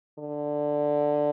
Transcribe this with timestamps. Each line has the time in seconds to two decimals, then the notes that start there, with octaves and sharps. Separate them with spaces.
0.18 D3